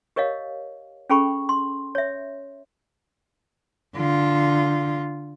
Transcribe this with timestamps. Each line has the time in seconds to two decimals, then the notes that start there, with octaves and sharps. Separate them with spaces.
0.16 G4 A#4 C#5 D#5 F5
1.10 C#4 G#4 A4 G5 B5 C#6
1.49 C6
1.95 C#5 E5
3.96 D3 F4